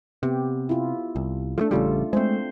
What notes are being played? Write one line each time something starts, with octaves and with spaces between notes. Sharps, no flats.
C3 B3 G4
E4 F4
C2
F3 A3 D4 A4
A1 C#3 G3 A3 F4 A4
G#3 A3 C4 C5